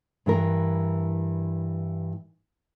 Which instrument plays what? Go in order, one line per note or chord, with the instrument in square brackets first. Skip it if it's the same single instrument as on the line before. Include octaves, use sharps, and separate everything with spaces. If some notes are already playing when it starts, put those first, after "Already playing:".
[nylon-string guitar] G2 E3 A#4